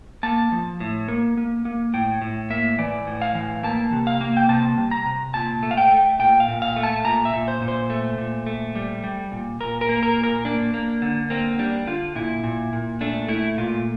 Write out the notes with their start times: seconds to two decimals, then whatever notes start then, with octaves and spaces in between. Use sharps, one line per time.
0.23 A#3 A5
0.52 F3
0.80 A2
1.08 A#3
1.37 A#3
1.65 A#3
1.94 A2 G5
2.22 A2
2.50 A#3 E5
2.79 E3 D5
3.07 A2
3.22 F5
3.35 E3
3.63 A#3 A5
3.92 C3
4.07 F5
4.21 A#3
4.37 G5
4.49 C3 A5
4.78 G3
4.91 A#5
5.06 C3
5.34 A#2 A5
5.63 A3
5.71 F5
5.77 G5
5.92 A3
6.19 A#2 G5
6.40 F5
6.48 A#2
6.62 F5
6.76 A3
6.83 A5
7.05 A#2 A#5
7.25 E5
7.33 A#2
7.48 C5
7.61 A#2
7.68 C5
7.90 A3
8.18 A#2
8.46 A3
8.75 G3
9.04 G3
9.32 A#2
9.60 A#2 A#4
9.81 A#4
9.89 A#3
10.03 A#4
10.16 A#2
10.23 A#4
10.45 A#3 D4
10.74 A#3
11.02 D3
11.30 A#3 C4
11.59 G3 D4
11.87 D3 F4
12.15 A#2 E4
12.44 A#2
12.73 A#2
13.01 A3 D4
13.28 A3 E4
13.58 A#2 F4